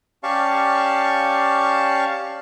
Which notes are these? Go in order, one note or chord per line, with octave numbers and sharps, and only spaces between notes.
C#4 G4 D5 F5 A5 C#6